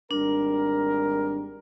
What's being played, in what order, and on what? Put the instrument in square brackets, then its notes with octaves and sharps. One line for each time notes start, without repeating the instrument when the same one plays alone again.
[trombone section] G#1 G3 A#4 [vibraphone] D4